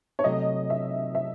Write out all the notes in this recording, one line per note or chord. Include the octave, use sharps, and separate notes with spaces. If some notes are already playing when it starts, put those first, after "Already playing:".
C#5
C3 F#3 A3 D#5
E5
E5